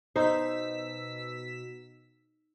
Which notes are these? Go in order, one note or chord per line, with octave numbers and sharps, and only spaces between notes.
B2 D#4 C5 E6 B6